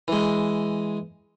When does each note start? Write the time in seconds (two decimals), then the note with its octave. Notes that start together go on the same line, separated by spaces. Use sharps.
0.08 E3 G#3